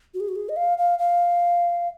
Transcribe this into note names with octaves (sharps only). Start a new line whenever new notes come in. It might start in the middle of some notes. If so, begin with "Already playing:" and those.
F#4
G#4
F#4
G#4
D#5
F5
F5
F5